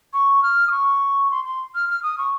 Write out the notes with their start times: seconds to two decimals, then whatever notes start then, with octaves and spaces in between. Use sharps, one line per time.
0.13 C#6
0.43 F6
0.67 D#6
0.71 C#6
1.31 C6
1.45 C6
1.75 F6
1.89 F6
2.03 D#6
2.18 C#6